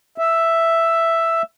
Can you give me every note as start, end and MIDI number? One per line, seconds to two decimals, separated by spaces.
0.18 1.42 76